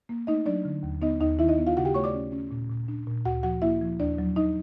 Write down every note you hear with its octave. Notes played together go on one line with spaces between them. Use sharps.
A#3
A3 D#4 D#5
F#3 D4 D5
D3
D#2
B3 D#4 D#5
D#2 D#4 D#5
D#3 E4 E5
D#4 D#5
B3
F4 F5
C#3 F#4 F#5
G4 G5
A3 C#5 C#6
D5 D6
C#4
C#4
A#2
A#2
D4
A#2
D2 F#4 F#5
F3 F#4 F#5
A#3 E4 E5
F3
D#2 D4 D5
F#3
D#4 D#5